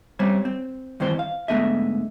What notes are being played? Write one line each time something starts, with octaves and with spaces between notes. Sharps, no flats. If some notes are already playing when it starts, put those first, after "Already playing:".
G3 C4 C#4 C5 C#5
C4
G2 D#3 E3 C4 C5
F5
G#2 D3 A3 B3 D#5 E5